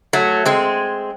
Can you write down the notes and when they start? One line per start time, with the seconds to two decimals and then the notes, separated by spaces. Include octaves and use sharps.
0.13 F#3 A3
0.45 G#3 C4